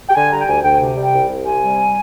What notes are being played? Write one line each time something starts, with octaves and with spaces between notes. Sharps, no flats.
G5
D3 G#5
G3 A#5
G5
D2 G#5
D2 G5
C3
G3
G5
C2
C2
C3 G#5
G3